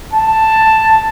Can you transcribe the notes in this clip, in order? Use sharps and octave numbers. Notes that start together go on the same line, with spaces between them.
A5